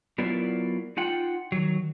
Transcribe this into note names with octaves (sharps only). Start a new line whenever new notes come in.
F#3 B3 E4 F4 A#4 D5
D#4 F4 F#5 G5
D#3 F#3